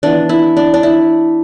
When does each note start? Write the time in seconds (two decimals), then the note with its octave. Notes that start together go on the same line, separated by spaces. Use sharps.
0.03 E3 B3 D4
0.29 E4
0.57 D4
0.74 D4
0.83 E4